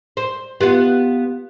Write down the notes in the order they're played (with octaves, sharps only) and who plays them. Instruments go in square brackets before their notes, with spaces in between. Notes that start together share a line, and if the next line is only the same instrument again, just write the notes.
[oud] C5
[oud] B3 F4 [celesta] G4